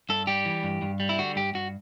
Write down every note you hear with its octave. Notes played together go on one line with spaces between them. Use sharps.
G2 A4
G3 G4
E3
G2
G2
G3
E4
D3 F#4
G2 G4
G2 F#4